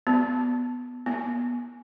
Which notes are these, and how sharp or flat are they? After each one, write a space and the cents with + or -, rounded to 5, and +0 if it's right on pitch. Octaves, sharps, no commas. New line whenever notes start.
B3 +5
B3 -30